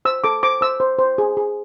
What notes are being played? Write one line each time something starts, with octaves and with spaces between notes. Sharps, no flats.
C5 E6
A4 D6
C5 D6
C5 E6
C5
C5
G#4
G#4